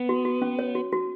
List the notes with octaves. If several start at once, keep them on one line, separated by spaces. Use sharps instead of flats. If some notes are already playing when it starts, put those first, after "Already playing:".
Already playing: B3
F#4
F#4
C#4
C#5
F#4
F#4